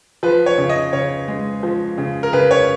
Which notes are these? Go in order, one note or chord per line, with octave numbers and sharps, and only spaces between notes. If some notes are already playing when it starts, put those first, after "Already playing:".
F3 B4
C#5
C#3
D#5
C#3 C#5
G#3
F3
C#3
A#4
C#3 B4
C#5